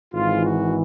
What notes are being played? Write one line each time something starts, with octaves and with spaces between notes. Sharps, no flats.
G#1 G#2 E3 F4
F#4